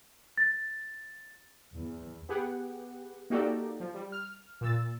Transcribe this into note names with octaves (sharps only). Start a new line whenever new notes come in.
A6
E2
B3 G4 G#4 F#5
A#3 D#4 F#4 G4 A4 D5
F3
G3
F6
A#2 E6 A6